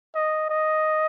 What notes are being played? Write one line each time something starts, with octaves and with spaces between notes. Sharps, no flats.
D#5
D#5